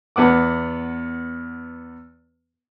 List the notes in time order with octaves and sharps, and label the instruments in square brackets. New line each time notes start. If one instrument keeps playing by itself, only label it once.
[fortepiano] E2 B3 F#5 D6